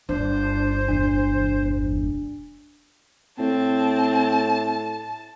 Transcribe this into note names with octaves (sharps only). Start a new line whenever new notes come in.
G1 D4 C5
E1 D4
A2 C4 A5